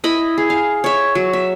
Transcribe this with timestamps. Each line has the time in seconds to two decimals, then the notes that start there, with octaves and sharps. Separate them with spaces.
0.04 E4 D#5 B5
0.38 G#4
0.50 F5
0.84 C#5 E5
1.15 F#3
1.33 E5